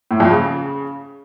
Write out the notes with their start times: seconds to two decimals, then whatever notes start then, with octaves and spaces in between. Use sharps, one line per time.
0.11 A2
0.20 F2
0.30 C#3